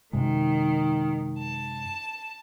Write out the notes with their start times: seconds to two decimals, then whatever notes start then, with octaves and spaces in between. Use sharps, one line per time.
0.13 F#2 C3 D#3 G#3
1.37 A5